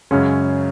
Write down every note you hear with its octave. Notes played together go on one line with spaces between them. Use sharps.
F#2 C#3 G#3 C#4